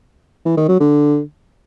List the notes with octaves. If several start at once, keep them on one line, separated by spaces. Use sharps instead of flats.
E3
D#3
F#3
D3